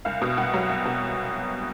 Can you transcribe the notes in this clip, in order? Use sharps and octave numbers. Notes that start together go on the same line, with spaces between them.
C2 F5
B2
C2 F#5
F#3
C2
B2